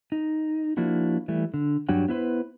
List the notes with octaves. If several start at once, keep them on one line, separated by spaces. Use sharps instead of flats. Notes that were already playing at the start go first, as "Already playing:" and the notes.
D#4
F3 A#3 D4 E4 F#4
E3 G3 A3
D3
G2 F#3 D4 G4 C#5 F#5
B3 E4 B4 C5